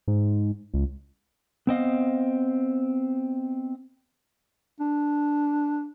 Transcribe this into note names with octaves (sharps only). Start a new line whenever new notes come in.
G#2
C#2
B3 C4 D#5 F5
D4